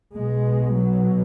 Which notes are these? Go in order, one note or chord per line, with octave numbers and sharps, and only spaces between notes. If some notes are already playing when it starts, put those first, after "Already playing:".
B1 B2 G#3
F#3